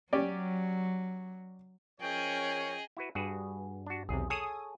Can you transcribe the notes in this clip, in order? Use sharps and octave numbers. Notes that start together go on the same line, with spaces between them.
F#3 C#4 G4 D5
F3 C#4 G#4 A#4 C#5 D#5 G5
E4 F#4 B4
G2 F#4 G#4 B4
D4 F#4
B1 E2 C3 G#4
G#4 A4 C#5 G#5 D#6